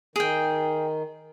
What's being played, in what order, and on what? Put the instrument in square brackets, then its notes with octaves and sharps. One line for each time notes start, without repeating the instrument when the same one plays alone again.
[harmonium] D#3 [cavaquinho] G#4 G5